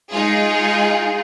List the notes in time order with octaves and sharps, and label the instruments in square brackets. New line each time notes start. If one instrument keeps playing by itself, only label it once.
[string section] G#3 D#4 F4 G#4